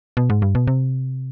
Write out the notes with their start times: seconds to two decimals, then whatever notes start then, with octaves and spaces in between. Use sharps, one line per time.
0.17 B2
0.30 G#2
0.42 G2
0.55 B2
0.67 C3